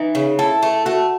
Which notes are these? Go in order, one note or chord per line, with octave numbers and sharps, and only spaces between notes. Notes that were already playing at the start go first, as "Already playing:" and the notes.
Already playing: E3 D#4
C#3
E4 A4
A3
A3 F#4